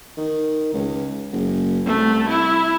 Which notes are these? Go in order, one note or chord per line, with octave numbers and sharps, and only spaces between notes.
D#3
C#2
F#1
C2 A3
E4